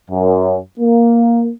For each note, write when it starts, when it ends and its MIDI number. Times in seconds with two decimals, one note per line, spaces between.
0.11 0.58 42
0.80 1.51 58